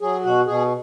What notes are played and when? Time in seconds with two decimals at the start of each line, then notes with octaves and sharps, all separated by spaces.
0.01 F#3 G#4
0.25 B2 F#4
0.46 B2 G#4